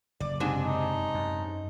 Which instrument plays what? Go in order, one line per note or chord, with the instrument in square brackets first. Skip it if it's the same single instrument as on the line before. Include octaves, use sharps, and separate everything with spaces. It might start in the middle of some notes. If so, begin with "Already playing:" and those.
[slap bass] F#1 [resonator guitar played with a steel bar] D5
[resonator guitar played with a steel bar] G#2 C3 D4
[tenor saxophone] D#4
[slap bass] F#2